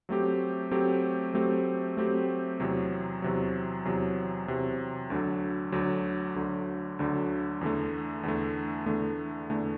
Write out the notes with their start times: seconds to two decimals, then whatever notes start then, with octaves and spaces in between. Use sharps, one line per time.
0.09 F#3 A3 C4 G4
0.71 F#3 A3 C4 G4
1.33 F#3 A3 C4 G4
1.97 F#3 A3 C4 G4
2.60 E2 C3 F#3
3.22 E2 C3 F#3
3.85 E2 C3 F#3
4.48 E2 C3 F#3
5.10 D2 D3 F#3
5.72 D2 D3 F#3
6.36 D2 D3 F#3
6.99 D2 D3 F#3
7.61 E2 D3 A3
8.23 E2 D3 A3
8.86 E2 D3 A3
9.50 E2 D3 A3